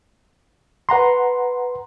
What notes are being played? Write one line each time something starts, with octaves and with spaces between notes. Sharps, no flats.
B4 F#5 A#5 C6